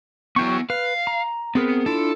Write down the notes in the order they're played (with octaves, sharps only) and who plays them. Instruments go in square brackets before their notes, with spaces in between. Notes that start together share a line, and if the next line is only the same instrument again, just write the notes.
[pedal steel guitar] F#3 G5 C#6 [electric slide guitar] B3 E4
[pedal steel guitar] B4 [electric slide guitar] F5
[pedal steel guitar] A#5
[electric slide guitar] B3 [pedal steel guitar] C4 G#4 A#4
[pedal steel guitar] D4 E4 F4 [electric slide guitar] A4